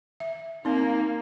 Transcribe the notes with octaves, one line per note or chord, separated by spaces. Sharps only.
E5
A#3 C4 D#4 F5